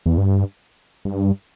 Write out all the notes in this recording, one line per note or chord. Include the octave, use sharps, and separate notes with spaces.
E2
G2
G2